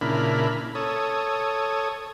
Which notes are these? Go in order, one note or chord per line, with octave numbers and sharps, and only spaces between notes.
A#2 C#3 D4 E4 A#4 B5
A4 C#5 D#6